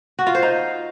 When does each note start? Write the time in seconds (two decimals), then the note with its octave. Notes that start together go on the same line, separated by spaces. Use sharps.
0.19 F#4
0.27 F4
0.35 C5
0.43 D#4